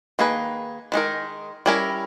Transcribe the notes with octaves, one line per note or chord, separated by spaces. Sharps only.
D#3 A#3 D#4 G#4 B4
D#3 G#3 D#4 A#4
G3 C#4 E4 A#4